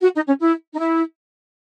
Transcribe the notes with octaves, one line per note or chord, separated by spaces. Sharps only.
F#4
D#4
C#4
E4
D#4
E4